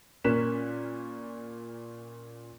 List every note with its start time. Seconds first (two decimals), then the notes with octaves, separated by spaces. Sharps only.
0.24 A#2 C#4 A#4 F#6 B6 E7